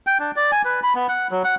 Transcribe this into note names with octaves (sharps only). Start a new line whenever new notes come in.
G5
D4
D5
G#5
B4
B5
B3
F#5
F#3
F#5